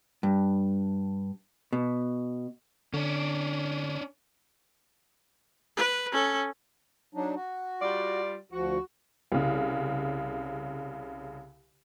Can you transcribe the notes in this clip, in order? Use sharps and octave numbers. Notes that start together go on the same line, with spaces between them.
G2
B2
D3 C#4 D4
B4
C#4 A4
F#3 D4 D#4
F#4
G3 F4 D5
D2 F3 F#4
C2 C#3